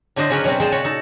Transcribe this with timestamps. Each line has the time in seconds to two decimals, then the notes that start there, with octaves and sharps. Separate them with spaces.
0.16 A2 D3 D4 C5 D#5
0.30 C#3 F#3 C#4 D4 A#4 B4
0.44 B2 F#3 G3 C4
0.60 A#2 G#3 G#4 C5 G5 A5
0.72 C#3 F#4 C#5
0.85 D#4 A4